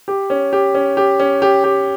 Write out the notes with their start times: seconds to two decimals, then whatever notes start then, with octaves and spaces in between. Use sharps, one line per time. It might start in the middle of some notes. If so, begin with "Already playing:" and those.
0.08 G4
0.30 C#4
0.53 G4
0.75 C#4
0.97 G4
1.20 C#4
1.42 G4
1.64 G4